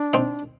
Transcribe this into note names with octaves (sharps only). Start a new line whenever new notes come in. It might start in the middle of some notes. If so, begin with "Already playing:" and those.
Already playing: D4
C4 D#4